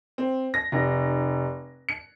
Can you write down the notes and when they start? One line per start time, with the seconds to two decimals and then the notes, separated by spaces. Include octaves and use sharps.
0.18 C4
0.54 A#6
0.72 F1
1.89 C#7